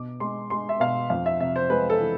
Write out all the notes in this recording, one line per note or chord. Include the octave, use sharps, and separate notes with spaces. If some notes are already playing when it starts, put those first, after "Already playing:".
Already playing: B2 D6
G#3 C6
G#3 C6
E5
B2 F5
F2 F5
E5
C3 E5
C5
G#3 B4
A4
E3